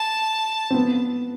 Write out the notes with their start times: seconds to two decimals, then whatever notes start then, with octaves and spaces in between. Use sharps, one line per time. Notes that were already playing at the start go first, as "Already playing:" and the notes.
Already playing: A5
0.70 C4
0.74 B3